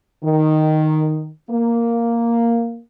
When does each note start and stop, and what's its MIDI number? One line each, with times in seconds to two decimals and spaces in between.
0.24 1.30 51
1.50 2.81 58